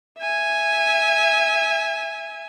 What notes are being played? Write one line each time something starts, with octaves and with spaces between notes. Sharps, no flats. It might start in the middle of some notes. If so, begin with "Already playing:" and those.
E5 G#5